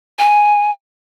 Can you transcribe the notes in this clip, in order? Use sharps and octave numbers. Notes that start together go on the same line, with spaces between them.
G#5